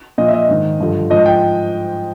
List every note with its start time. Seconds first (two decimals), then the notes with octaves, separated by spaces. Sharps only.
0.18 A#2 F3 D#5
0.28 E5
0.34 D#5
0.48 G#2 D#3
0.80 G2 D3 F3
1.10 G#2 F3 D#5
1.26 G5